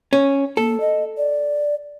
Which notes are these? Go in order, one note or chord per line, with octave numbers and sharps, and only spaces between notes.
C#4
A#3 A4
D#5
D5